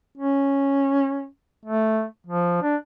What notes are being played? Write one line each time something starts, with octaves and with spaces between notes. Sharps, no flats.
C#4
A3
F3
D4